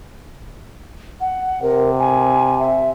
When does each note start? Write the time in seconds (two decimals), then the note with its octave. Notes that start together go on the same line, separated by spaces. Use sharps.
1.21 F#5
1.63 C3 A#4
1.99 G#5
2.60 E5